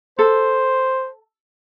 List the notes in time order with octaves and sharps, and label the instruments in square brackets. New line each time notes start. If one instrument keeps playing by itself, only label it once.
[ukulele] A4 [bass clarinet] C5